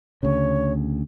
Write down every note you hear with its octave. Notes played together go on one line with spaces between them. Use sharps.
D2 C#3 C#5